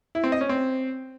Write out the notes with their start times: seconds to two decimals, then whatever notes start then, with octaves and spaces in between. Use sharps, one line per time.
0.15 E4
0.24 C4
0.32 D#5
0.41 C#4
0.49 C4